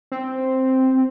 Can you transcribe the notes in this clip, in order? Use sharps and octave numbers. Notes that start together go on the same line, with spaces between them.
C4